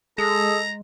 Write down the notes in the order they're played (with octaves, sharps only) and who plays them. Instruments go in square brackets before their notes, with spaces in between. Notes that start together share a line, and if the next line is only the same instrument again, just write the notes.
[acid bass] G#3 [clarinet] G#4 [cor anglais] A4 [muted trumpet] A#5